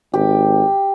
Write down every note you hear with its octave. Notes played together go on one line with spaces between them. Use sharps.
G#1 G4